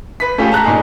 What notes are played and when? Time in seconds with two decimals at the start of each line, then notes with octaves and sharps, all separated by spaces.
0.20 B4 B6
0.38 A3 C#4 F4 G4 G#4
0.52 A5 A#5 F#6
0.64 A#2 D#4 G#4